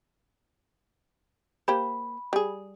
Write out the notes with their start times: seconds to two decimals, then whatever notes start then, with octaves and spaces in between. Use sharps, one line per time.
1.68 A#3 G4 C5 B5
2.33 G3 G#4